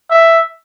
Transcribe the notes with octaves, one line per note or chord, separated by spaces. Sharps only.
E5